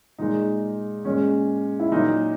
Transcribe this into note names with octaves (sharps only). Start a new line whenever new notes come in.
A#2 G#3 D#4
A#2 G#3 C#4
E4
A#2 F#3 D#4